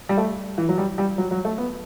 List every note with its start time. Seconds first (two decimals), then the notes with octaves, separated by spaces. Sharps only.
0.09 G3
0.17 A3
0.58 E3
0.69 F#3
0.78 G3
0.98 G3
1.18 F#3
1.31 F#3
1.45 A3
1.58 B3